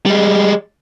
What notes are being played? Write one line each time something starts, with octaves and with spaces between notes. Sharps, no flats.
G3 G#3